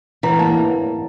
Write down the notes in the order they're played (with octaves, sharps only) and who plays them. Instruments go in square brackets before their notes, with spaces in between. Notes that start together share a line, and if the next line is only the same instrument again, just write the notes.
[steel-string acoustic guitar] E3 [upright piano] A#5
[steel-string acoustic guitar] A#3 [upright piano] A5